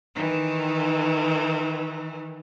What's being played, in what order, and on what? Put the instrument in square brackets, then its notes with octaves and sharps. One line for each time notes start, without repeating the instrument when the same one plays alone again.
[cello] D#3 E3